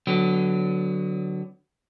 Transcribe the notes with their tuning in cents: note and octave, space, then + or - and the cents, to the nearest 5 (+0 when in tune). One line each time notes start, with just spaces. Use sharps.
D3 +0 F#3 +0 B3 +30